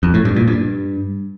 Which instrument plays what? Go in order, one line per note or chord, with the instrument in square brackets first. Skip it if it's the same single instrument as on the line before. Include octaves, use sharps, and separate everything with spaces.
[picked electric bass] F2
A2
G2
A#2
G2